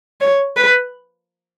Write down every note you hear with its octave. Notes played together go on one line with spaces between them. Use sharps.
C#5
B4